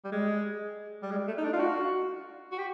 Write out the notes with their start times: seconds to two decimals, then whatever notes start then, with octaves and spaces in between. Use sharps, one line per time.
0.05 G3
0.12 G#3
1.03 G3
1.11 G#3
1.28 A3
1.38 D#4
1.44 D4
1.53 F4
1.60 F#4
2.52 F#4
2.58 G4